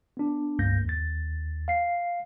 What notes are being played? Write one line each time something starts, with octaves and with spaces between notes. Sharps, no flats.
B3 D4
G1 C#2 G2 A#3 G6 A#6
D#2 A6
F5 C7